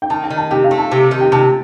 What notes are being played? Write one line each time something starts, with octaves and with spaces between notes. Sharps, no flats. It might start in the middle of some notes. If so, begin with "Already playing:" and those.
G5
D#3 A5
G5
D#3
A5
C3 G5
F5
A3
A5
C3
D#3
G5
C3 A5